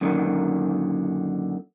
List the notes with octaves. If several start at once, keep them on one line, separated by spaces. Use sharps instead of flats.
F#2 A#2 D3 D#3